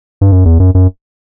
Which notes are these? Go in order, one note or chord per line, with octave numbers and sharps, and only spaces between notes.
G2
F#2
E2
F#2
F#2